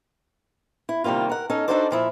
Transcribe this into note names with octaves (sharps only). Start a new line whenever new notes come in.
E4
C3 D#3 G3 A#3 F4
A#4 F#5
C#4 D#4 A4
D4 D#4 F#4 A4 C5 D5
A#2 F3 E4